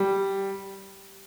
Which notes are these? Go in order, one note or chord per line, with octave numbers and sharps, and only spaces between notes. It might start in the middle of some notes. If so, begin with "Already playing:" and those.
Already playing: G3